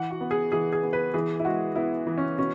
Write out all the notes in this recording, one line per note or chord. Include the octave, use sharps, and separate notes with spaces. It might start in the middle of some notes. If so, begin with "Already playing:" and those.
Already playing: E3 F#5
F#4
B3
G#4
E3 G#4
G#4
B3
B4
E3 G#4
E4
G#3 F#4
B3 E4
E3
C#4
B2 C#4